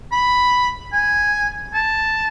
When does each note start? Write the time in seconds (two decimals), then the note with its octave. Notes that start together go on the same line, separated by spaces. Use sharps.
0.12 B5
0.93 G#5
1.74 A5